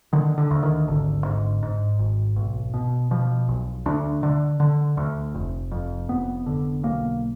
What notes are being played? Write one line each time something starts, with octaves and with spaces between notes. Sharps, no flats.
D3 D#3
D3
D2
D#3
G#1 D3
G#2
G#2
G#1
B1
B2
B2 F3
B1
D2 D4
D3
D3
D2
F1
F2
F1 B3
D3
B1 A#3